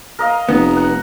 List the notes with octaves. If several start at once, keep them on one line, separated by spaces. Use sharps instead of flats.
A#4 D#5 F5
F1 B3
F#5